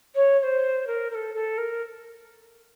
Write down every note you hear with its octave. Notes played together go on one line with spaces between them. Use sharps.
C#5
C#5
C5
A#4
A#4
A4
A4
A#4